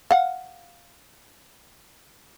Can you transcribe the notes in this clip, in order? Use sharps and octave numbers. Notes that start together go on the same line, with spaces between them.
F5 F#5